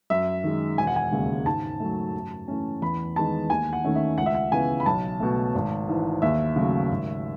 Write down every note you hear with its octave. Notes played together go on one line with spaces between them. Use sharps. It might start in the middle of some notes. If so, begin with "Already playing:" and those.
F#2 E5
D#3 G#3
E1 G#5
F#5
G#5
D#2 C#3 G#3
G#2 A5
F#3 A3
F#2
E3 A3 C#4
E2 B5
D#3 G#3 B3 A5
D#2 G#5
F#5
D#3 A3 C#4
E5
C#2 F#5
E5
F#5
C#3 E3 B3 G#5
B5
B1 A5
B2 A3
G#1
G#2 E3
D#2 E5
C#3 F#3 A3
G#1